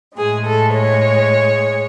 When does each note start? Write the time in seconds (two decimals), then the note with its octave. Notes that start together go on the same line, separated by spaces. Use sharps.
0.18 A2 G#3 G#4
0.46 A4
0.74 C#5